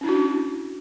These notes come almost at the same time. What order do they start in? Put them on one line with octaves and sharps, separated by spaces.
C#4 E4 D4 F#4